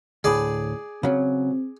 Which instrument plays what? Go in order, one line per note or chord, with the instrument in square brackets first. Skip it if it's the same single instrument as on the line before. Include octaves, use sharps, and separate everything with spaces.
[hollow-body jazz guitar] D2 A2 [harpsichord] G#4 D5
[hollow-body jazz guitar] C#3 F#3 [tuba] C4